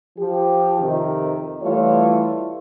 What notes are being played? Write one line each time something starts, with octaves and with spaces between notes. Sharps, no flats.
F3 G4
F2 C3 D#3
E3 G3 A3 F4 C#5